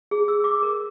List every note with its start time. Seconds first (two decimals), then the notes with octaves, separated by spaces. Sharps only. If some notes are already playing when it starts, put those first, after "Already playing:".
0.11 G#4
0.28 E6
0.44 D6
0.63 A#4